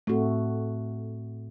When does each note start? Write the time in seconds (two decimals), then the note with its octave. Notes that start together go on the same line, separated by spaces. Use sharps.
0.07 A2 A3 C4 F#4